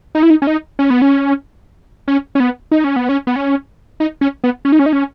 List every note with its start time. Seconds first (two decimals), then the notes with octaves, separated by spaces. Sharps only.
0.15 D#4
0.23 E4
0.30 D#4
0.42 C#4
0.47 D#4
0.79 C#4
0.90 B3
1.02 C#4
2.08 C#4
2.35 C#4
2.40 B3
2.71 D#4
2.84 C#4
2.96 B3
3.09 C#4
3.27 B3
3.36 C#4
4.00 D#4
4.21 C#4
4.44 B3
4.65 C#4
4.72 D#4
4.79 C#4
4.86 D#4
4.93 C#4